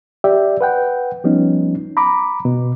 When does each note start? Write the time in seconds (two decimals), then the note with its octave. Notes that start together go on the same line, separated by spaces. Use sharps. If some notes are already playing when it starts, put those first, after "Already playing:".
0.24 G4 D5 E5 G5
0.61 B4 F#5 G5
1.24 F3 G3 B3 C#4 D#4
1.97 A#5 B5 D6
2.45 B2